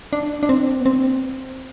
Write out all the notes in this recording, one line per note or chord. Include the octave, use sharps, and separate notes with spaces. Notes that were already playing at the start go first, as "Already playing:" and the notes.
D4
D4
C4
B3
C4